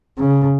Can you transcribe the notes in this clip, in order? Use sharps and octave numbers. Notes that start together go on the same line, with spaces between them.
C#3